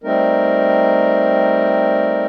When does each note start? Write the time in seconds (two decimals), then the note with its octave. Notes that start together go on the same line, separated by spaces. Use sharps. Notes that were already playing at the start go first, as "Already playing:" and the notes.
0.04 G3 A3 C4 D#4 A#4